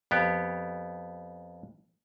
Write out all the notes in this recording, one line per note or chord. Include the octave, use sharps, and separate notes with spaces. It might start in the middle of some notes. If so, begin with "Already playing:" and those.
F2 B3 G4